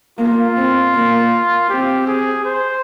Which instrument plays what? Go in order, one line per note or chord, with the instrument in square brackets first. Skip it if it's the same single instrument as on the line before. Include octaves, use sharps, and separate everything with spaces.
[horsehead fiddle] A#3 [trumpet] F4
[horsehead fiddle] C4
A#3
[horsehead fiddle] C4 [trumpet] G4
[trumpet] G#4
C5